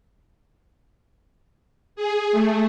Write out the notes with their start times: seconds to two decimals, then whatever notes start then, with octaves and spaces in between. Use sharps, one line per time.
1.96 G#4
2.32 A3